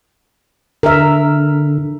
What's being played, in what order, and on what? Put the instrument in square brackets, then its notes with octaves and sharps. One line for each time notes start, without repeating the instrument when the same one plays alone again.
[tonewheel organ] D3 [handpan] A#4 E5